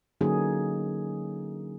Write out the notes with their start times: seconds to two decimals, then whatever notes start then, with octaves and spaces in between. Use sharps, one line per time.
0.21 D3 F#3 A#3 C#4 D#4 G#4